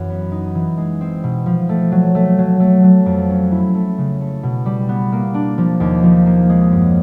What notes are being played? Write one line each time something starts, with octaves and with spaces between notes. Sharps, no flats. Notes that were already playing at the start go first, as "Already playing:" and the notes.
Already playing: F#2 E3
B3
D#4
E3
G#3
C4
B2
F3
A3
F#3
A3
F#3
A3
F#3
F2
C#4
E4
A3
C#3
A3
B2
G3
B3
A#3
D4
F3
D#2
F3
A#3
G#3
F#2